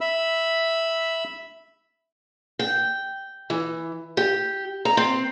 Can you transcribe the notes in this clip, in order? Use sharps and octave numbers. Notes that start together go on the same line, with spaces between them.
E5 B5 E6
G5
E3
G4
A#5
C4